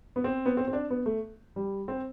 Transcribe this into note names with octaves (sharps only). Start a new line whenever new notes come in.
B3
C4
B3
C4
C4
D4
B3
A3
G3
C4